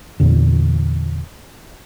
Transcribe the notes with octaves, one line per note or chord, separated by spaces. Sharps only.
E2 A#2 D3